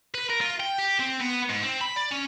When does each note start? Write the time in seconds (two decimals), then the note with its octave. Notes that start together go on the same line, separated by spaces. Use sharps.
0.14 B4
0.30 A#4
0.41 F4
0.60 G5
0.78 G4
0.99 C4
1.20 B3
1.50 G#2
1.63 C4
1.81 B5
1.96 D5
2.11 C#4